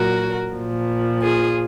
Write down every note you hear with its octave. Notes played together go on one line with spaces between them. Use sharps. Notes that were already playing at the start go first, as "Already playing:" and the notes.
Already playing: A#2 F#3 F#4 A#4
A#2 F3
F4 G#4